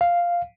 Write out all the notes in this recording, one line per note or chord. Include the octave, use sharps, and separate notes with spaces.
F5